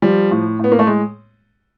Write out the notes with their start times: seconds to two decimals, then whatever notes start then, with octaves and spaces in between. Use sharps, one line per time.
0.02 F3 G3
0.31 A2
0.59 A2 B3
0.72 A#3
0.79 A3
0.87 G#3